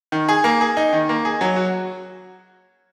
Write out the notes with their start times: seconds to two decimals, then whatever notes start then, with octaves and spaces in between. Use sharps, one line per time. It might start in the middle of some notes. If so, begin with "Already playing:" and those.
0.12 D#3
0.29 G#4
0.44 A#3
0.61 G#4
0.77 D#4
0.93 D#3
1.09 A#3
1.25 G#4
1.41 F#3
1.56 F#4